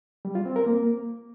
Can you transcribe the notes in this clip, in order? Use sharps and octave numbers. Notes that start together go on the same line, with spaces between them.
G3
F4
C4
A#4
A#3